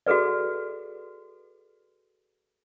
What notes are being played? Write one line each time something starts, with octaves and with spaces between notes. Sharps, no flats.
F#4 G#4 A4 B4 D5